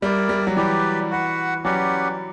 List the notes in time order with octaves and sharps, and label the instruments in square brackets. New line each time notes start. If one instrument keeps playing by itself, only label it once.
[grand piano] G3 [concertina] E4 A#4 D5
[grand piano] G3
F#3
[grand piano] E3 [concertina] G4 B4 D5
[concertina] F#4 B4 F#5
[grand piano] F#3 [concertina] C#4 G4 B4 D5 F#5